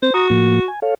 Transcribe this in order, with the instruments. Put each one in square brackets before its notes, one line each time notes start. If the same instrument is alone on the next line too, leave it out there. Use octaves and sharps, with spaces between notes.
[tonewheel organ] C4 [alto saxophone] C5
[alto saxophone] F#4 [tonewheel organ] A#5 D#6
[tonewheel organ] A2 F3 A#3
G#5
A4 C#5 F5